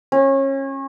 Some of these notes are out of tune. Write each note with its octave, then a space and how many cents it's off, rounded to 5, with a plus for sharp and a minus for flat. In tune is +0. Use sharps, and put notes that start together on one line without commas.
C#4 -30